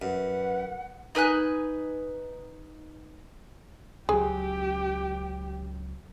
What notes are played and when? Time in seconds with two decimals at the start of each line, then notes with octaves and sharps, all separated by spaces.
0.02 F#2 B4 F#5
1.15 D#4 B4 G#5 F#6
4.09 C#2 F#3 G4 G#4 G#5